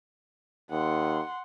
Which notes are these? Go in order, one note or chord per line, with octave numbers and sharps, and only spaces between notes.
D#2 F#5 C6